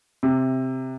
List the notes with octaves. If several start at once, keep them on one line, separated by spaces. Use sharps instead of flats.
C3